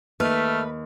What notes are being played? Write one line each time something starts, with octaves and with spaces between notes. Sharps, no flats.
D#2 A3 B4 F6